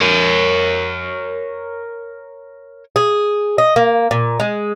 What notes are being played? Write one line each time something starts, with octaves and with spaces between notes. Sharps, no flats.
A#4 C#5
G#4
D#5
A#3
A#2
G#3